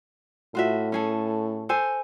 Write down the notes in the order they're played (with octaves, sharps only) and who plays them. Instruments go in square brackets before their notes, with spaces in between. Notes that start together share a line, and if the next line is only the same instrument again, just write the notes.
[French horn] A2 [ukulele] F4 F#4 E5
[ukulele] C#4 G#4 A4
A4 C5 G#5